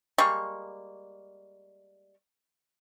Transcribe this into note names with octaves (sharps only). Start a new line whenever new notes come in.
G3 G#3 A#3 C#6